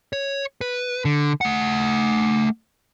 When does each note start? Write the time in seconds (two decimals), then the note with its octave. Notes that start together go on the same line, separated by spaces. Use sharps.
0.13 C#5
0.61 B4
1.05 D3
1.41 A3 F#5